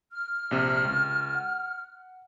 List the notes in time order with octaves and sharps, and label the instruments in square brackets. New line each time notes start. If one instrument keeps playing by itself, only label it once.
[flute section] F6
[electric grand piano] A#1 C3
C#2
F#5